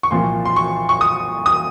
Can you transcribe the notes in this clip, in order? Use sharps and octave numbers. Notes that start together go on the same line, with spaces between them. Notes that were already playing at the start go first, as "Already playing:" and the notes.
C#6
C2 A#2 F3 C6
C6
C#6
C#6
D#6
D#6